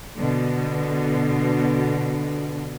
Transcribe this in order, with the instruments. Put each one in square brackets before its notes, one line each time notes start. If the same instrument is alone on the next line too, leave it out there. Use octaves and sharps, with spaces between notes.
[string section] B2 D3